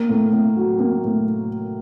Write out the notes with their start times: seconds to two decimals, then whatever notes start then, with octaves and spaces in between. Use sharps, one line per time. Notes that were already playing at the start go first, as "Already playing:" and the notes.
Already playing: A#3
0.09 A2
0.33 A2
0.57 F#3
0.80 A#3
1.04 A2